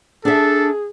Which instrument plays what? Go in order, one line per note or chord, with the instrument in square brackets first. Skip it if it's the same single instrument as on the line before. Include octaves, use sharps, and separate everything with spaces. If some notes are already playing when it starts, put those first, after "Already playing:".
[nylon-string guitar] D4 E5 [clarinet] G#4 [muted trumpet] A4